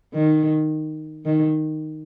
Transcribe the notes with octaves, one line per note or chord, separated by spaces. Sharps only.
D#3
D#3